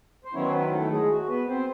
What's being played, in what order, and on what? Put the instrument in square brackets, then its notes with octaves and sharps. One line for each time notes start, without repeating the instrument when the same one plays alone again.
[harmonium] C5
D#3 F#3 B3 C#4 E4 C#5
C5
B3 B4
A3 A4
G#3 G#4
F#4
B3 B4
C4 C5